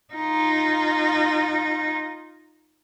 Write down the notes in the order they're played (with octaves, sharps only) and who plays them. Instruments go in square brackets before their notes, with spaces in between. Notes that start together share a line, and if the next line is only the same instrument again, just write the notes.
[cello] D#4 F4